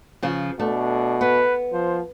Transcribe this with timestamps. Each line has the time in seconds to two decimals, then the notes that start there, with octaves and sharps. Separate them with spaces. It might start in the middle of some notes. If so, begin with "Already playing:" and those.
0.23 C#3 F3
0.60 B2 A3 D4
1.21 B3 B4
1.73 F3 C5